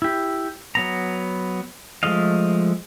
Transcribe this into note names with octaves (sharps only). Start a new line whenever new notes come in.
E4 G4
F#3 B3 A#5
F3 G#3 A3 D#5 F5